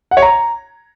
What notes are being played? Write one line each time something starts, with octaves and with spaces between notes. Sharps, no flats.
F#5
C#5
A#5